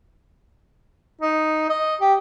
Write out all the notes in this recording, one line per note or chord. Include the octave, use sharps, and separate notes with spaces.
D#4
D#5
G4